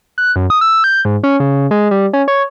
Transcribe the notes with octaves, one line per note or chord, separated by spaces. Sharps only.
F#6
F#2
D#6
E6
G6
G#2
C#4
C#3
G#3
G3
C#4
C#5